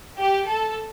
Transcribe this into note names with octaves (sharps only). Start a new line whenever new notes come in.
G4
A4